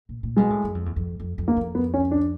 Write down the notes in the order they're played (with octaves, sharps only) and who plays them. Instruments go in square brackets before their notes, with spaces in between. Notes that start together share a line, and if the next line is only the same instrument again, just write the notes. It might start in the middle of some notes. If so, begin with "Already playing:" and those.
[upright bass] A#2
A#2
[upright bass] B2 [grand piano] G#3
[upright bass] A2
F#2
F2
E2
F2
F2
F2
[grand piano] A#3
[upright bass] F2
[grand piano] B3
C#4
D4